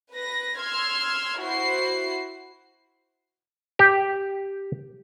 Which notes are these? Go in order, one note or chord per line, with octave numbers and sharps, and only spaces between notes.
B4 A#6
C6 E6 F6 G#6
E4 F#4 C5 C7
G4